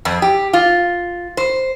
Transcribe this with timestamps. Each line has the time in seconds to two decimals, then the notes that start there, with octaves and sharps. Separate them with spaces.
0.05 F2
0.22 G4
0.53 F4
1.37 C5